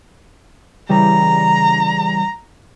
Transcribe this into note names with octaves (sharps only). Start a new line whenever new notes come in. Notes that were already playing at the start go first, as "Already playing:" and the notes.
C#3 E3 G3 A#5